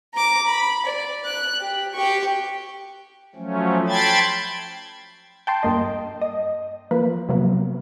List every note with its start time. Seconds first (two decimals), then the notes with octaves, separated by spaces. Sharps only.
0.14 A#5 D6
0.46 B5
0.85 D5
1.25 F#6
1.60 G4
1.94 G4 C#6
3.36 F3 F#3 A3 C#4
3.88 G5 A5 B5 C6 G#6 A6
5.47 G5 A5 C6
5.63 G2 A#3 D#5
6.22 D#5
6.91 F3 A#3 B4
7.29 C3 F#3 A#3 B3